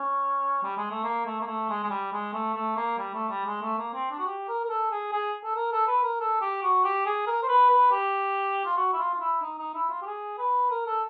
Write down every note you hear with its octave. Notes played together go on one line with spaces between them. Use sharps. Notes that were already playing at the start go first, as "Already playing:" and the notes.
Already playing: C#4
G3
G#3
A3
A#3
A3
A#3
A3
G#3
G#3
G3
G#3
A3
A3
A#3
G3
A3
G3
G#3
A3
A#3
C4
D4
F#4
G4
A#4
A#4
A4
G#4
G#4
A4
A#4
A4
B4
A#4
A4
G4
F#4
G4
G#4
A#4
C5
B4
B4
G4
F4
F#4
E4
F4
F4
E4
D#4
D#4
E4
F4
G4
G#4
B4
A#4
A4